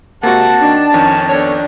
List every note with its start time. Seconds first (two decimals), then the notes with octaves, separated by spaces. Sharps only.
0.23 C3 G#3 A#3 C4 F#4 F#5 A5
0.62 D#3 D4
0.94 F2 D#3 C#4
1.29 B3 D4 A4 C#5